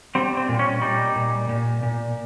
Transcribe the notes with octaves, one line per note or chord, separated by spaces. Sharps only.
G3 C4
C4
A#2
C#4
G3 D#4
A#2
A#2
A#2